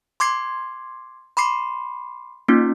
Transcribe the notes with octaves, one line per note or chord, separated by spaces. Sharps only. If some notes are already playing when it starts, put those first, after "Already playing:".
C6 D6 G#6 C7
B5 C6 D6 C7
A#3 C#4 D#4 F4